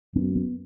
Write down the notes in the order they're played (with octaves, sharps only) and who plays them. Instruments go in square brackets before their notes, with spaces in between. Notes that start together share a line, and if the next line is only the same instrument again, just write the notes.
[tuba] F#2 [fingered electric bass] B3
[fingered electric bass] B3